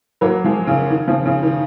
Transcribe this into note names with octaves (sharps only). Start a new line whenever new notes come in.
F#3 A#3
F3 G#3
C#3
D#3
C#3 F3
C#3
D#3